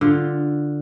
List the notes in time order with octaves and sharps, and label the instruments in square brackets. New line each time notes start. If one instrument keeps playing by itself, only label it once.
[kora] D3 F4